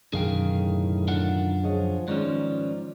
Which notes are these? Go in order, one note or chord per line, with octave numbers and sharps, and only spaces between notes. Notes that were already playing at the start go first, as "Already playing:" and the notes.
F#2 B2 D3 D#3 G#4 F5 G5
A2
D4 F4 F#5
F3 G#4 C#5 D#5
G#2 D#3 F3 G#3 C#4 D5